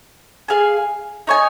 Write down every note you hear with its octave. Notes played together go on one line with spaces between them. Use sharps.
G#4 F5 G#5
D#4 C#5 G#5